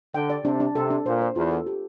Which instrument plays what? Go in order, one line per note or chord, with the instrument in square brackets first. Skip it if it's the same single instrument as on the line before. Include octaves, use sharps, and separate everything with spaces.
[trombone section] D3 [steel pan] G5
[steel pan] D5
[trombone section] C3 [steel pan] D4
[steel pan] D4
[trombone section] C3 [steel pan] A4
[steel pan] D4
[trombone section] A#2 [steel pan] C5
[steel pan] C5
[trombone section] E2 [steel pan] F4
[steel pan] A4
G4